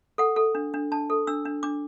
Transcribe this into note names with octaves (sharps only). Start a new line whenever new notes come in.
A4 F#5
A4
D4
D4
D4 A5
A4
D4 E6
D4
D4 D6